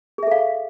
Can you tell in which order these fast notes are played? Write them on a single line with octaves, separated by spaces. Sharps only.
G#4 E5 A4 F5